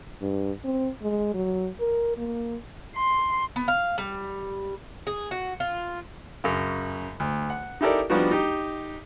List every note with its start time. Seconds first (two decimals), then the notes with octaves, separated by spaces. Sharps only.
0.22 G2
0.64 C4
1.02 G#3
1.34 F#3
1.80 A#4
2.17 A#3
2.97 C6
3.56 B3
3.68 F5
3.98 G3
5.07 G#4
5.31 F#4
5.60 F4
6.44 F#2 C#3
7.20 D2
7.50 F#5
7.81 D#4 E4 G4 A4 A#4 D5
8.10 F3 G3 B3 D4 D#4 F#4
8.31 D#4 G4